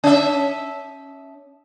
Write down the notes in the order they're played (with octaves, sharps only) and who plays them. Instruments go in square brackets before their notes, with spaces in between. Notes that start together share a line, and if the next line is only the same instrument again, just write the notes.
[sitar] C#4 E5